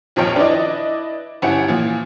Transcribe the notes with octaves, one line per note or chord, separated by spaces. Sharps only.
A#1 F2 D#3 F3 C#5 G5
D4 E4 B4 D5 D#5
G1 C#4 E4 G4 F#5 C#7
A#2 E3 F3